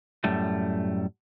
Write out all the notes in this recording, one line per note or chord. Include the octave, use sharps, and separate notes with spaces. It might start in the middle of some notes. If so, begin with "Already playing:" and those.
F#2 A2 G3 A3